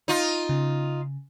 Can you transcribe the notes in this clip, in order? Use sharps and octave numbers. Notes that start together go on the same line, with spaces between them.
D#4 F4
C#3